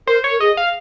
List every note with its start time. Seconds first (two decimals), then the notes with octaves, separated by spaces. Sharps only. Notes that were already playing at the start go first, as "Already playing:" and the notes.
0.07 A#4 C5
0.24 C#5
0.31 A#4
0.40 G#4 D#5
0.57 F5